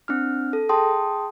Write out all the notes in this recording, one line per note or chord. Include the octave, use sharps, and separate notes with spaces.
C4 D4 F6
A4
G#4 G5 A5 C6 D#6